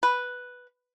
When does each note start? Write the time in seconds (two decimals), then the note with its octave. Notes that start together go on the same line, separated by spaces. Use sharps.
0.03 B4